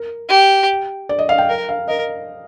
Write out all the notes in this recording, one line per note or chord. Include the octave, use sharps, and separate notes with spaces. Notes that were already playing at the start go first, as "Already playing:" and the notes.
Already playing: A#4
G4
D5
D#5
F5
G5
A#4
F5
A#4 D#5